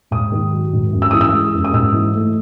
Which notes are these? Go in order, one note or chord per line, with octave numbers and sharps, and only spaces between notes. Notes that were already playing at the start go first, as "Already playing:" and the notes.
G#2 D#6
D#3
F#3
G#2
F#2
E6
E3 D#6
E6
G#3
F#2
D#6
G#2 E6
E3
A3